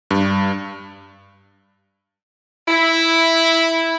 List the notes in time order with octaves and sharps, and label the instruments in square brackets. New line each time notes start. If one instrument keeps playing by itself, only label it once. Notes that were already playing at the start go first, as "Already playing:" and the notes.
[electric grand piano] G2
[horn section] E4